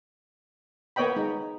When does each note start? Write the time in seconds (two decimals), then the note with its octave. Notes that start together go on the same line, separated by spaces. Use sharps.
0.96 A#3 B3 C#5 D#5 G5 B5
1.16 G#3 D#4